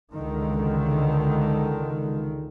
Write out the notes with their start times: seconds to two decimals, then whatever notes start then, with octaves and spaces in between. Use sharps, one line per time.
0.14 C#2 D3 D#3